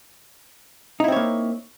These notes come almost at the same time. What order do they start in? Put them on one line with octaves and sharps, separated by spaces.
D#4 E4 C4 C#5 A#3